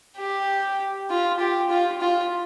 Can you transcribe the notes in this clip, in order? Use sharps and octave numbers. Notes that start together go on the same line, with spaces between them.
G4
F4
G4
F4
F4